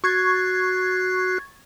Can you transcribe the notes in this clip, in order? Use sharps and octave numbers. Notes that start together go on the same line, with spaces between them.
F#4 C#6 F#6 G#6 A6 C7